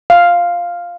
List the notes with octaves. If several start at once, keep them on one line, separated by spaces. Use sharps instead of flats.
F5